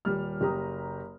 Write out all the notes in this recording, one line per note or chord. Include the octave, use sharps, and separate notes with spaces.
D#1 G3 F6
F#1 G4 A#5 D#6